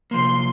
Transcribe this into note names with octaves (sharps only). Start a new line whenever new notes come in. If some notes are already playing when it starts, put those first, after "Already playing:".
C3 F3 A#3 C6